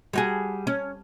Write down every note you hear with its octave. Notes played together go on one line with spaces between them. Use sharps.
G3 F#4 G#4
C#4